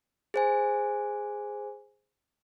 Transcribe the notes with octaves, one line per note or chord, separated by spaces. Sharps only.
G#4 C5 G#5